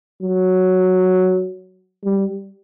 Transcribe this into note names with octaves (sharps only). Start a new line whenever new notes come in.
F#3
G3